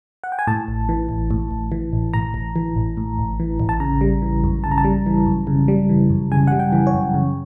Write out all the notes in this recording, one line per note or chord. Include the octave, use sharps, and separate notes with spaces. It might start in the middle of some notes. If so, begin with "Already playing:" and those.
F#5
G5
G#5
A2 A5
A1
E3
A1
A2
A1
E3
A1
A2 A#5
A1
E3
A1
A2
A1
E3
A1
A5
C#3 A#5
G3
E3
F#2
C#3 A5
A#5
A5
G3
E3
F#2
C#3
G3
E3
F#2
C#3 G#5
G3 F#5
G5
E3
C#5
F#2
C#3